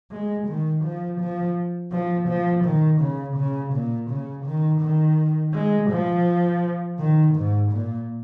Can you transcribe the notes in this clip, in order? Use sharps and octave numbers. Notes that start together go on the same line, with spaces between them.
G#3
D#3
F3
F3
F3
F3
D#3
C#3
C#3
A#2
C#3
D#3
D#3
G#3
F3
D#3
G#2
A#2